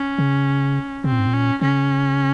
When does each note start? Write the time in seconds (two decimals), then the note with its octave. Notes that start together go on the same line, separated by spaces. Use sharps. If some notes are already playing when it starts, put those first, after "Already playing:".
Already playing: C#4
0.19 C#3
1.04 C3 C4
1.12 A#2
1.19 G#2
1.27 A#2
1.34 C#4
1.62 C#3 C#4